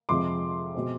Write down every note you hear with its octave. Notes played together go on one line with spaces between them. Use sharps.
F2 C3 F3 G#3 C6 D6
B2 G#3 C4